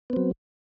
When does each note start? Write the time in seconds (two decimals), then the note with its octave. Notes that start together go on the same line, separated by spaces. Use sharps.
0.10 B3
0.13 C4
0.16 F#3